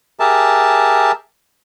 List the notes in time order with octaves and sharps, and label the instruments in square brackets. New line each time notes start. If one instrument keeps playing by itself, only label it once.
[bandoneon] G4 G#4 A#4 E5 A5